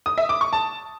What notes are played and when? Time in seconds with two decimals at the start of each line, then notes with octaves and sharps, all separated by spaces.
0.06 D#6
0.18 E5
0.29 D6
0.41 C#6
0.53 A5